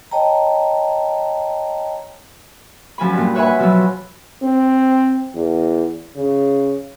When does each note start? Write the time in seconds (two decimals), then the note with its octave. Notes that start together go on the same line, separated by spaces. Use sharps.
0.11 C#5 D#5 G5 A5 A#5
2.98 F#2 F3 G#5 B5
3.13 G2 A#2
3.35 B4 C#5 E5 F#5 G#5 B5
3.59 B2 F3 F#3 B3 E6
4.43 C4
5.35 E2
6.16 C#3